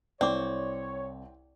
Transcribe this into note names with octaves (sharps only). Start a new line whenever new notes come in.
C2 C4 C#5 D5 D6